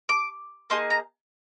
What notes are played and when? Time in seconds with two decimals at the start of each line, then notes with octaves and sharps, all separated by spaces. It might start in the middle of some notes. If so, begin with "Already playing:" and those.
0.09 D6
0.70 A#3 D#4 G#4 C6
0.90 A#5